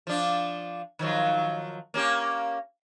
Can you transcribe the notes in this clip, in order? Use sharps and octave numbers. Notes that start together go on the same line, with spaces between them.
F3 D4
D#3 F3 F#3
A#3 C#4 G4